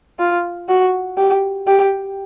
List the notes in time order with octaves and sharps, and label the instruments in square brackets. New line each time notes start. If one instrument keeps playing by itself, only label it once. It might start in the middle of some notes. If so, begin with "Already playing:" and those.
[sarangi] F4
F#4
G4
G4